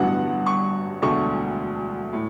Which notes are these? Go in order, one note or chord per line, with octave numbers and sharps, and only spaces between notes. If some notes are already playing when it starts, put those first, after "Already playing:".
Already playing: A1 G2 D3 F#3 B3 F#5
C#6
E1 D2 D3 A3 C#6
A2